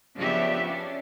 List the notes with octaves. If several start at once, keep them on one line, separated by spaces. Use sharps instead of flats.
C#3 F3 B3 D4 G4 E5
C#4 D4